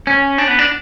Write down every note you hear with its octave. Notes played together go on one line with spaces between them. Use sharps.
C#4
D4
B3
D4